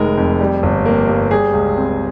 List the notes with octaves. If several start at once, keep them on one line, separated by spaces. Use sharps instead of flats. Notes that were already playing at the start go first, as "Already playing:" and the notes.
Already playing: F1 D#3 G#3 A#4
F2
G3
G1
A#3
G2
G3 G#4
C#2
C4